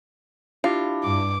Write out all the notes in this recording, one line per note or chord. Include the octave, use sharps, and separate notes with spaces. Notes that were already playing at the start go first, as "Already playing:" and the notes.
D4 E4 F4 G4
G2 D6